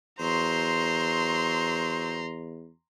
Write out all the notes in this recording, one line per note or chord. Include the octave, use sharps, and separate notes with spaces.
E2 F#3 C5 A#5 C6